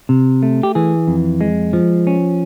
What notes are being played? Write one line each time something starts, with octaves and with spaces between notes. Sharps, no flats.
C3
A3
G4
E3 G#4
F2
G#3
F3
C#4